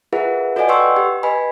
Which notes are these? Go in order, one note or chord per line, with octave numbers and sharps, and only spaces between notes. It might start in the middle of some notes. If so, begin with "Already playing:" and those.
F4 G#4 A#4 B4 E5 F#5
F#4 A4 D5 D#5 F#5 G#5
B4 F#5 G5 C6 C#6 E6
G4
B4 D#5 G#5 B5